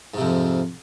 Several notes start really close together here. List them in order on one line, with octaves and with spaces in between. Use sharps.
G#2 C3 F2